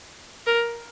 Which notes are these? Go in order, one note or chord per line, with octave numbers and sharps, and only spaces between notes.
A#4